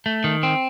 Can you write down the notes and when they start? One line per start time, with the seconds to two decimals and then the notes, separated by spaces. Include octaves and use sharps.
0.06 A3
0.24 D#3
0.43 C4